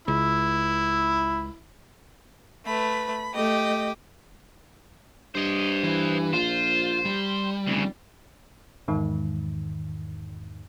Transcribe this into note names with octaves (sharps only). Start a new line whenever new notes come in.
C#2 E4
A3 B4 B5
A3 G4 D#5
G2 C5 D#5
E3
A#1 F4 C5
G3
F1 D2 C#3
E2 G#2 D#3